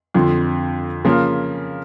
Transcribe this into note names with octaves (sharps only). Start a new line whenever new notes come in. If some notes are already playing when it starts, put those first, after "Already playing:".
F2 D3 F3
C#3 F3 A#3